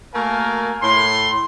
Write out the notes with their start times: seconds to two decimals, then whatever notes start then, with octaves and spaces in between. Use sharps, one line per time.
0.15 A3 A#3 F#4 A#4 F5 G#5
0.83 A2 C6